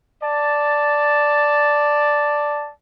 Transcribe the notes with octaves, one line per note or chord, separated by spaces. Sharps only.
D5 A5